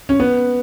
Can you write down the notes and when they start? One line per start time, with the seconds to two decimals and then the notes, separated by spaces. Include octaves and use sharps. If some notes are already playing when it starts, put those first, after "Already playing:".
0.09 C#4
0.20 B3